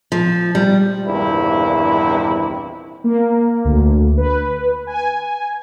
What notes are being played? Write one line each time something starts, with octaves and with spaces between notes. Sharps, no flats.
F3
G3
A#1 E2 G2 C3 D#3 E4
A#3
D2
B4
G#5